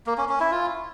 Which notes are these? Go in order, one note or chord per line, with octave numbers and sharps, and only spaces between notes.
A#3
C#4
C#4
E4
F4